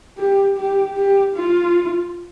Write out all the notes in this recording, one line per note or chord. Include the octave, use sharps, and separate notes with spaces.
G4
G4
G4
F4